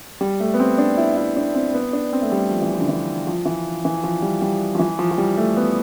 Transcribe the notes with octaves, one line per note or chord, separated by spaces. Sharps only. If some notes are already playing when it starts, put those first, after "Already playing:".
G3
A3
B3
C4
D4
E4
E4
D4
C4
B3
D4
C4
A3
G3
F3
E3
F3
D3
E3
F3
E3
E3
F3
G3
G3
F3
E3
F3
F3
G3
A3
B3